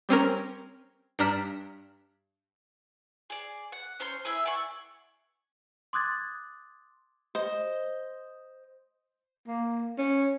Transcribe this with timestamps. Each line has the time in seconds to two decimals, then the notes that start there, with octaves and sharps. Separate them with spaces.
0.09 G3 C4 C#4 A#4
1.19 G2 D4 A#5 F6 B6 E7
3.30 G#4 D5
3.72 F#5
4.00 C#4 C5 C#5 C6
4.25 E4 G#4 E5 G#5
4.46 D5 F#5 G#5 C#6
5.93 C6 D6 D#6 F#6 G#6 A6
7.35 C5 D#5
9.47 A#3
9.98 C#4